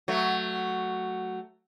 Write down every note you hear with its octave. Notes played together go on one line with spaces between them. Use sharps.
F#3 A3